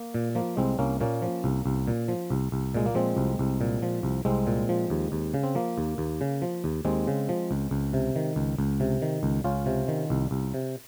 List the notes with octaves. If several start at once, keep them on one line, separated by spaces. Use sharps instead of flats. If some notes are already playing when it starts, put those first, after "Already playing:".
Already playing: A#3
A#2
F3 A#3
C2 G#3 C4
C2 A#3 C#4
A#2 A#3 C#4
F3
C2
C2
A#2
F3
C2
C2
A#2 G#3
A#3
F3 G#3 C4
C2
C2
A#2
F3
C2
C2 G#3 C4
A#2
F3
D#2
D#2
C#3
C4
F3 A#3
D#2
D#2
C#3
F3
D#2
D#2 G#3 C4
C#3
F3
C#2
C#2
C3
D#3
C#2
C#2
C3
D#3
C#2
C#2 C#4 F4
C3
D#3
C2
C2
C3